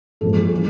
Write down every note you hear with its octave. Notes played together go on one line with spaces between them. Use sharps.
A#2 F3 G#3 A4
G#4
E3 G3